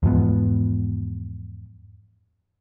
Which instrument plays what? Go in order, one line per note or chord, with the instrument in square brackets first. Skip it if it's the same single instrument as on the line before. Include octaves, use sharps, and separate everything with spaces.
[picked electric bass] E2 G#2 F3 B3